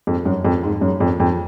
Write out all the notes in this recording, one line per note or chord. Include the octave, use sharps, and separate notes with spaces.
F2
F#2
F2
G#2
F#2
F2
F2